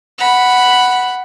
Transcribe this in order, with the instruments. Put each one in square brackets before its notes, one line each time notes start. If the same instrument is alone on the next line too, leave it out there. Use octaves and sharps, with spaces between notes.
[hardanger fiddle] F#5 B5